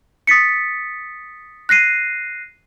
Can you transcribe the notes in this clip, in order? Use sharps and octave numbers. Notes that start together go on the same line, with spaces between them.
D#6 A6 B6 C#7
F#6 A#6 C7 D#7